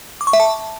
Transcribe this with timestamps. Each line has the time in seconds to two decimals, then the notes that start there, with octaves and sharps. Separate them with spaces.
0.21 D6
0.27 C#6
0.33 E5
0.40 A5